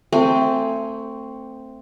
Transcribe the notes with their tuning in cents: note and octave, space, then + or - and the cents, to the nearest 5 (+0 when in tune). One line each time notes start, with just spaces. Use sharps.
A3 +25 C4 +0 G#5 +0